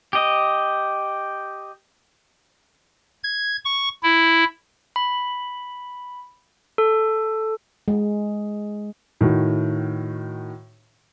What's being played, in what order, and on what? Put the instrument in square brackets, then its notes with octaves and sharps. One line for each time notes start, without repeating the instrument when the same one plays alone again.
[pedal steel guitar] G4 D#5
[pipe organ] G#6
C#6
E4
[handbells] B5
A4
[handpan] G#3
[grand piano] A2 D#3 F#4